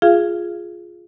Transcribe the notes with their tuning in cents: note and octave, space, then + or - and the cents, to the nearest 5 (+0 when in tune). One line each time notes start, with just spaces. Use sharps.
F4 +0 G#4 +0 F5 -30